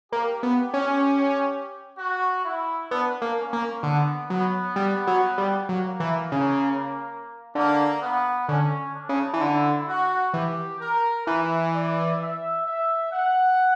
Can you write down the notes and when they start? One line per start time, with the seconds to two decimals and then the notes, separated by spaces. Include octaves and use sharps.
0.12 A#3 G4
0.43 B3
0.74 C#4
1.98 F#4
2.45 E4
2.91 B3 D4
3.22 A#3
3.37 C#4
3.53 A#3
3.83 D3 B3
4.30 F#3 B3
4.76 G3
5.07 F#3
5.38 G3
5.69 F#3 A#3
6.00 E3
6.32 C#3
7.55 D3 A#3
8.02 B3
8.48 D3 C#4
8.94 D4
9.09 C#3
9.33 E3
9.41 D3 E4
9.87 F#4
10.34 E3 G4
10.80 A#4
11.26 E3 B4
11.73 D5
12.19 E5
12.66 E5
13.12 F#5